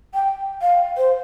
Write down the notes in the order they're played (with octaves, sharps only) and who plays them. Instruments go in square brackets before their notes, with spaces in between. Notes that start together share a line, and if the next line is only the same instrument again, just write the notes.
[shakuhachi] G5
F5
C5